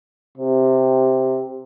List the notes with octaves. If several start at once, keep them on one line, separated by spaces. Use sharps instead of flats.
C3